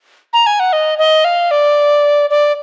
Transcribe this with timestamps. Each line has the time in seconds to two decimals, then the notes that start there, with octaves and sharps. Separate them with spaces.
0.33 A#5
0.46 G#5
0.60 F#5
0.73 D#5
0.98 D#5
1.25 F5
1.51 D5
2.30 D5